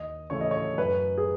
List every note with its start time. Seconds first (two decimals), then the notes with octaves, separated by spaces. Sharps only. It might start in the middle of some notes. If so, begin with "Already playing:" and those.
Already playing: D#2 D#5
0.30 C#3 E3 A3 C#5
0.41 D#5
0.51 C#5
0.77 F#2 B4
1.18 G#4